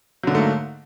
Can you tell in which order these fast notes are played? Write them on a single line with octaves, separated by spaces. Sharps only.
F#3 D3 G#2 A3 A#3